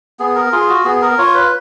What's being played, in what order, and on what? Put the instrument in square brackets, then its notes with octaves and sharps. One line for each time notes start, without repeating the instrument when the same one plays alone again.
[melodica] B3 G#4
A#4
F4 G#4
F#4
B3 G#4
A#4
F4 C#5
B4